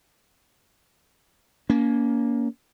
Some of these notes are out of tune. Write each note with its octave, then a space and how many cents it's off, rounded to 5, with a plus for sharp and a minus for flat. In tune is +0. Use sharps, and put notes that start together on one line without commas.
A#3 +10 C#4 +35